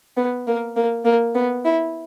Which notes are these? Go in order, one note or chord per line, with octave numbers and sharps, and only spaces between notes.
B3
A#3
A#3
A#3
B3
E4